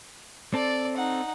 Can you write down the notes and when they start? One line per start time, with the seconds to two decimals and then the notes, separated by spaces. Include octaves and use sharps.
0.54 C4 A4 D5
0.96 D#4 F#5